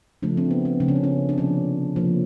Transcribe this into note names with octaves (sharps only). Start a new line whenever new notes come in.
C#3 F3 A3 D4
C4
B3
C4
C#3 F3 A3 D4
C#4
C4
C#4
D4
C3 F3 A#3 C#4
C3 F3 A#3